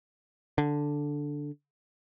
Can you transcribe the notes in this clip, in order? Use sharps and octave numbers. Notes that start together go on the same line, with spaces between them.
D3